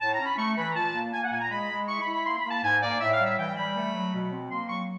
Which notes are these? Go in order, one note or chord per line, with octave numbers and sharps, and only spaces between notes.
A2 A5
A#5
C#4
B5
A3 C#6
E3 B5
A#5
A#2 A5
A#3
A#3 G#5
F#5
A#2 G#5
A#5
G#3 B5
G#3
E4 C#6
B5
E4
B5
A#3 C6
B5
A#3
A5
G#2 G#5
A#3 D5
A2 E5
F5
G3
E5
E3 G5
G3 B5
A3
F#3
B2
C4
A#3 C6
F#3 C#6